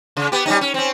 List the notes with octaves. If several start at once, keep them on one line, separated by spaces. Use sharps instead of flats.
C#3
B3 G4
G3 C#4 D#4
C#4
C4 C#4